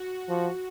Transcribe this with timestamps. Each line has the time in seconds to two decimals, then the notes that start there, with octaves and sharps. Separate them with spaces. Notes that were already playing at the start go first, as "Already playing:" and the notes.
Already playing: F#4
0.29 F3 F#4